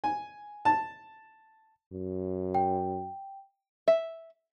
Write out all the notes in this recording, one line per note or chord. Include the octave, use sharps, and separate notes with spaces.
G#5
A5
F#2
G5
E5